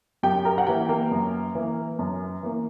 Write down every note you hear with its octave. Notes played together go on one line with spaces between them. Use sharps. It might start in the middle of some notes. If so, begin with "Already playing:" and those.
F#2 G4 G5
A#4 A#5
F#5
E3 A#3 G4 G5
A#3 A#4
F#2
E3 A#3
F#2
E3 A#3